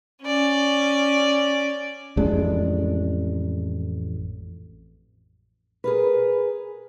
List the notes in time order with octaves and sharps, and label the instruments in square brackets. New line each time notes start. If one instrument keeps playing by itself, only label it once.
[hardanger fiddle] C#4 D5
[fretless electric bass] A1 F2 G#3 D4
[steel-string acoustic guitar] G#4 A#4 B4